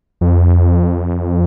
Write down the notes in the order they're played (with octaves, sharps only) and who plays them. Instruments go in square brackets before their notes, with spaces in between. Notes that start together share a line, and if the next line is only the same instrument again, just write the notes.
[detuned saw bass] F2